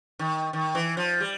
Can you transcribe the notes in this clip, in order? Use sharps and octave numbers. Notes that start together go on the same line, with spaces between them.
D#3
D#3
E3
F3
G3